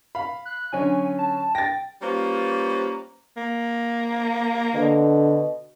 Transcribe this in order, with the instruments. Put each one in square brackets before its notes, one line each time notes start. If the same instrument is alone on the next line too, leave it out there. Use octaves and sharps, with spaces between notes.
[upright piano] F5 B5
[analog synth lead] F#6
[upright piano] D3 F#3 C#4 [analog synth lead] G#5
[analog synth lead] A5
[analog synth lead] G5 [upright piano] A6 A#6
[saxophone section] G3 A#3 C#4 F4 B4 C5
[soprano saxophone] A#3
[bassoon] B2 [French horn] D3